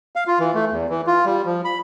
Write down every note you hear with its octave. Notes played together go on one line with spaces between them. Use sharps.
F5
F4
E3
A3
E2
E3
F4
G3
F3
B5